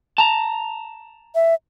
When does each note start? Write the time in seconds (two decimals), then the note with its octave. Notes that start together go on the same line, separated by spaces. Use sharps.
0.18 A5 A#5
1.35 E5